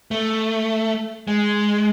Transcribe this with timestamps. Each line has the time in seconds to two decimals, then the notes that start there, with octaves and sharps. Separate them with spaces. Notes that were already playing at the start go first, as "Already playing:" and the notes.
0.11 A3
1.28 G#3